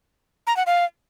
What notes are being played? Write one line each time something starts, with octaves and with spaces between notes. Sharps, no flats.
A#5
F#5
F5